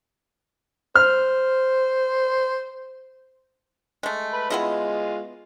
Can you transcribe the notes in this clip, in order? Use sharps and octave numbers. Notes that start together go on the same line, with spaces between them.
C5 F6
G#3 A3
B4 B5
G#3 B3 E4 F4 D#5